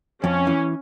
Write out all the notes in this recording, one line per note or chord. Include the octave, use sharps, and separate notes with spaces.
F2 C#4
E3